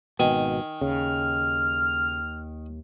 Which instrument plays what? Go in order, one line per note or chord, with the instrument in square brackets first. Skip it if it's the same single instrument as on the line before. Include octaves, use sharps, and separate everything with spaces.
[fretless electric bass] G#1 B2 [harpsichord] D#3 G#5
[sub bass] D#2 [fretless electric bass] C#3 [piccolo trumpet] F6